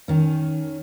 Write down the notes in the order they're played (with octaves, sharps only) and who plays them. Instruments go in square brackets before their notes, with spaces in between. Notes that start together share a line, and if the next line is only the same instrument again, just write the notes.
[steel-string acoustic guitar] D#3 C#4